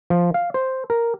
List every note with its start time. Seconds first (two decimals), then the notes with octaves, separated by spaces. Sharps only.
0.10 F3
0.34 F5
0.54 C5
0.90 A#4